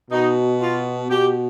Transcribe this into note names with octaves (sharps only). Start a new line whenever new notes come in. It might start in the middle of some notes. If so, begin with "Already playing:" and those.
B2 D#4
F4
B2 G4